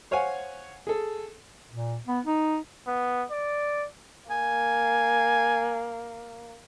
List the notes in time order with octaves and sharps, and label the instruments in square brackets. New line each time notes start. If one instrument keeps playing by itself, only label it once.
[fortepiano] C5 C#5 F5 F#5 G#5
G#4 A4
[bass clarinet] A#2
B3
D#4
[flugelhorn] B3
D5
[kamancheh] A#3 [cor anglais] G#5